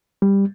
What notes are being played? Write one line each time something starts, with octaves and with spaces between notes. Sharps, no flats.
G3